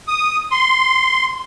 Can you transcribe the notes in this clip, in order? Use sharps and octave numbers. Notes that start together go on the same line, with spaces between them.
D#6
C6